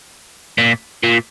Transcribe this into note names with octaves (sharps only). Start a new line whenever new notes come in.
A#2
A#2